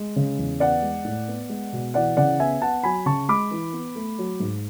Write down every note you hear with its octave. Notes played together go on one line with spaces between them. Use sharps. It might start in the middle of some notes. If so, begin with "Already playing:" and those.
Already playing: G#3
C#3
E2
B3 D5 F#5
G#3
A2
B3
G#3
B2
E3 D5 F#5
C#3 D5 F#5
B3 E5 G#5
B3 F#5 A5
F#3 G#5 B5
C#3 A5 C#6
G#3 B5 D6
E3
B3
A3
F#3
G#2